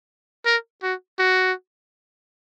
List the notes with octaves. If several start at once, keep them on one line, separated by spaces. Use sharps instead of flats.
A#4
F#4
F#4